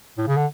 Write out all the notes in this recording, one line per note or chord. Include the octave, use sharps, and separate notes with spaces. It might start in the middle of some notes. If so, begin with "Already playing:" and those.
A2
C#3
D3